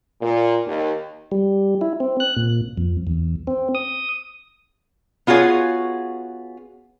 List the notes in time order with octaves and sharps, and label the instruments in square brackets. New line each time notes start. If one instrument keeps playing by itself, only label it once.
[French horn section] A#2
D#2
[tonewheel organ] G3
E4
C4
F#6
A#2
F2
E2
C4
D#6
[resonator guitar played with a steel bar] B3 F4 F#4 G#4 C#5